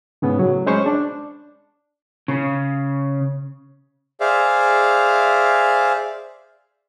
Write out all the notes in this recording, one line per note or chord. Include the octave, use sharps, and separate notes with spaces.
G#2 C#3 B3
A2 F#3
G#3 C#4 C5 B5 C#6
D4
C#3
G#4 C5 D5 E5 F5